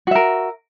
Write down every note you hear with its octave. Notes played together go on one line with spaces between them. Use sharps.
F#4 A#4 E5